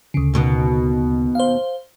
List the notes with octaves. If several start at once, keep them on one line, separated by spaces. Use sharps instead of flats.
D2 C#3
D#2 B2 B3
C5 F5